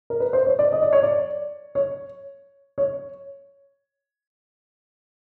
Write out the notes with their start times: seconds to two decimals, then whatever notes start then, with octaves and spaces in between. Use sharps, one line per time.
0.10 A#4
0.20 B4
0.33 C5
0.46 C#5
0.59 D5
0.72 D#5
0.82 D5
0.93 C#5
1.03 D5
1.75 C#5
2.78 C#5